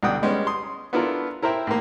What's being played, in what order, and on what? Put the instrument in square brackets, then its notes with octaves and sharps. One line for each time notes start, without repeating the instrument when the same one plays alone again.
[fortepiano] C2 B2 D3 F#5 G5 D#6
G3 G#3 B3 C#4
C6 D#6
B3 D4 E4 F4 A4 A#4
E4 A#4 C5 E5 G5
A2 A#3